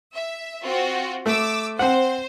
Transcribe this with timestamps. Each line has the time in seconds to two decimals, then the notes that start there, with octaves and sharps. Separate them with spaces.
0.13 E5
0.63 C4 F4 F#4
1.26 A3 D6 E6
1.79 C4 C5 F#5